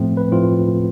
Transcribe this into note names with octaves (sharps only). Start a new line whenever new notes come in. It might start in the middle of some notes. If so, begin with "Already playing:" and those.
Already playing: A2 F3 A3 C4
B4
A2 F3 A3 C4 F4